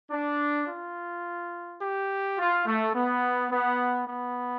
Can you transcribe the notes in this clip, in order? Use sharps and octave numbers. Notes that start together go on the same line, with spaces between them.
D4
F4
G4
F4
A3
B3
B3
B3